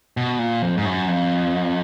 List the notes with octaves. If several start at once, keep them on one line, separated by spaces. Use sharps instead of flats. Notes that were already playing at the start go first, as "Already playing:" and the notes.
B2
A#2
F2
G#2
F#2
F2